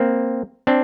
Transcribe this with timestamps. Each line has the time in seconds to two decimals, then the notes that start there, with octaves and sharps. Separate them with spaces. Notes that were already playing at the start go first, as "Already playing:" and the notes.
Already playing: A#3 C4
0.67 C4 D4